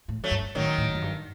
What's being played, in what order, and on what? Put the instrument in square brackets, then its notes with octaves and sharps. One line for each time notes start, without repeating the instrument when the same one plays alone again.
[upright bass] A2
[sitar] F#3 A3
[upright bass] G2
[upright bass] A2 [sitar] D#3 F#3
[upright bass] A2
F#2
G2